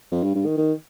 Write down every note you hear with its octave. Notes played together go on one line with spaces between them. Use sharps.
F2
G2
G2
D#3
D#3